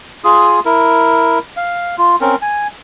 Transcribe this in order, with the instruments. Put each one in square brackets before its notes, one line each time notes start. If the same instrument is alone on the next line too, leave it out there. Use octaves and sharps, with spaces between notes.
[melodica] F4 G#4 D#6
E4 A#4
F5
F4
C4 C#4 A#4
G#5